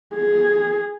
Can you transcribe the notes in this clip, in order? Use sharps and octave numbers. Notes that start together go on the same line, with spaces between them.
G#4